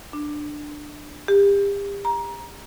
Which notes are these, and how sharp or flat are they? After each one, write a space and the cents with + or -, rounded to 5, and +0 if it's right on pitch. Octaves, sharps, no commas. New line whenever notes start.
D4 +15
G4 +35
A#5 +20